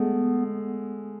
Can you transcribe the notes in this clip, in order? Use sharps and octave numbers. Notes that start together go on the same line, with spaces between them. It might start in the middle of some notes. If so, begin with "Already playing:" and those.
Already playing: G#3 A3 B3